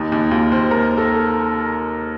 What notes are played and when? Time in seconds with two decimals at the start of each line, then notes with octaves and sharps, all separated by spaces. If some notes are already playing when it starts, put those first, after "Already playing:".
Already playing: D#2 D#4
0.12 D#2
0.31 D#2 F4
0.52 D#2 C5
0.71 D#2 A#4
0.98 A4